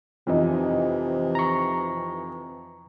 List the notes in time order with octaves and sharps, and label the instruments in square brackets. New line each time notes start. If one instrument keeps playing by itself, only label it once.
[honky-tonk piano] F2 E3 D#4 [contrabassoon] C3
[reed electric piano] A#5 C#6